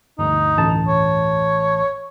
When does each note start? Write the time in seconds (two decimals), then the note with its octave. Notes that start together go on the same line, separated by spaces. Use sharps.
0.19 G1 D2 D#4
0.58 A1 A5
0.88 C#5